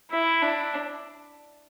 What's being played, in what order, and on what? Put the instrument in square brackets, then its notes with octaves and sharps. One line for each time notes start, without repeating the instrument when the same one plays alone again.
[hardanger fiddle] E4 [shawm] E5
[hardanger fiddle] D4